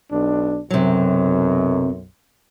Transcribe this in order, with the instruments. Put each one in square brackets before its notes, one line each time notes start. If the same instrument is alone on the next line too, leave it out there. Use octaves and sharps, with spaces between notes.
[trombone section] B1 D4
[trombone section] B1 F#2 [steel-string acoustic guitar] C3 F#3